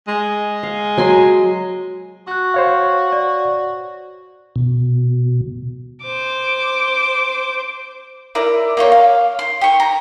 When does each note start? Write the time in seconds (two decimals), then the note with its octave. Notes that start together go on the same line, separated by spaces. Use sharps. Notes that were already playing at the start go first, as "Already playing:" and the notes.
0.08 G#3
0.63 F5
0.98 F#3 G#5 C6
2.27 F#4 C#6 F#6
2.54 C5 C#5 F5
3.13 D5
4.56 B2
6.02 C5 D6
8.35 E4 A#4 D5
8.77 A#3 F4 C#5
8.92 F5
9.39 C6
9.61 G4 C#6
9.80 A#5